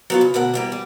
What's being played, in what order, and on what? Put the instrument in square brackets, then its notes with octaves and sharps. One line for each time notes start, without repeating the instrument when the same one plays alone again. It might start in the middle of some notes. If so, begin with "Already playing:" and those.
[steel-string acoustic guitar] F#3 B3 F4
C#3
D2 B2 A#4 F#5
E3 G3 A#3
G3